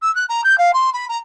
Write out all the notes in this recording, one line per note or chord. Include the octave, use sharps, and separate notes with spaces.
E6
F#6
A#5
G6
F5
C6
B5
A#5